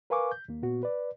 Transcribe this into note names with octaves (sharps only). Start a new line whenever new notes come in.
A#4 B4 F5 G#5 C#6 D6
G6
D#2 A#3
A#2 B3 F#4
B4 D5